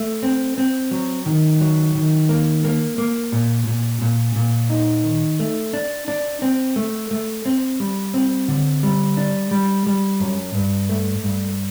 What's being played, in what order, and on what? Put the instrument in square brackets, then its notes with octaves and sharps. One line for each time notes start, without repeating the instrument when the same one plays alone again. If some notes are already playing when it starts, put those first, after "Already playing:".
Already playing: [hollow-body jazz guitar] A3
C4
C4
F#3
D#3
F#3
D#3
A#3
A#3
A#3
A#2
A#2
A#2
A#2
D#4
D#3
A3
D4
D4
C4
A3
A3
C4
G3
C4
D3
G3
D4
G3
G3
F#2
G2
A3
G2